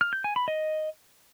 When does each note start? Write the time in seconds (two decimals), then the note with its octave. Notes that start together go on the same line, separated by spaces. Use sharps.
0.01 F6
0.13 G6
0.24 G#5
0.36 B5
0.48 D#5